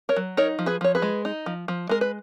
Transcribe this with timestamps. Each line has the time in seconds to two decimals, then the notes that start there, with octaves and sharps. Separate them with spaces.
0.09 A#4 C#5
0.16 F#3
0.37 D#4 A#4 C#5
0.59 F3
0.66 G#4 B4
0.81 F3 C#5
0.95 G#4 B4
1.02 G#3
1.25 D#4
1.46 F3
1.68 F3
1.89 G#3 A#4
2.01 B4